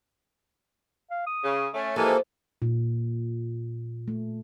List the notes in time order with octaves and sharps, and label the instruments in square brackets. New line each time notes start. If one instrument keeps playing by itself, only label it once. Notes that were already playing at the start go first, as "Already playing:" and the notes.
[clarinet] F5
D#6
[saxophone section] C#3
A3 C#4
[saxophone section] E3 G#3 [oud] F3 [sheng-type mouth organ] A#3 A4 [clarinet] G4
[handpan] A#2
A3